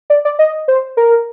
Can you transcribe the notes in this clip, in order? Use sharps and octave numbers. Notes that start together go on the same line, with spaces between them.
D5
D5
D#5
C5
A#4